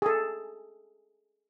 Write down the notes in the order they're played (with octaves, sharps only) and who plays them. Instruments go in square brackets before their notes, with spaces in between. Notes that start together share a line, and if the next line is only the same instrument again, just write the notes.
[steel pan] G#4 A4